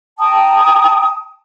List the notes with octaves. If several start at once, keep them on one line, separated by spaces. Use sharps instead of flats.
G5 A5 A#5 D#6